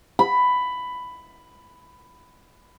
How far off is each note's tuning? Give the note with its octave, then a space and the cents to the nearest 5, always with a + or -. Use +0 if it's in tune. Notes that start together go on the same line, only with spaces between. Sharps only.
B5 +10